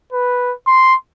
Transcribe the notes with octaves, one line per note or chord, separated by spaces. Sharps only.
B4
C6